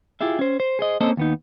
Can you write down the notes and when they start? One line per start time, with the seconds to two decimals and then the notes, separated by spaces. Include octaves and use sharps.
0.21 E4 F4 G4 G#4 E5
0.39 C#4 C5
0.60 C5
0.79 G#4 C5 D#5
1.01 A#3 C4 C#4 A4 C5 D#5
1.17 D#2 B3 D#4